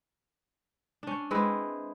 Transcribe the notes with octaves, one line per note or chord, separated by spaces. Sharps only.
C#4 D4
G#3 C4 E4 B4